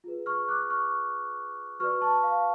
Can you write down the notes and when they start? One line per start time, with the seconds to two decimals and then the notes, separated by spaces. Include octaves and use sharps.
0.04 F4 G#4 B4
0.26 C#6 F6
0.48 D6 F#6
0.70 C#6 F6
1.80 F#4 B4 D5 C#6 F6
2.01 A5 C#6
2.23 F5